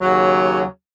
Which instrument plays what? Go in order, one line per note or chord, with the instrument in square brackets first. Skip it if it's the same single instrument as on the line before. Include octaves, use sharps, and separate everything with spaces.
[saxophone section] D#2 C#3 F#3